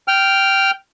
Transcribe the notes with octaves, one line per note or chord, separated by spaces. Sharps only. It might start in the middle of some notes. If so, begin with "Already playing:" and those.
G5 F6